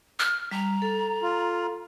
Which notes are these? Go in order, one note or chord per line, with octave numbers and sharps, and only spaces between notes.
F6
G3 A#5
A4
F4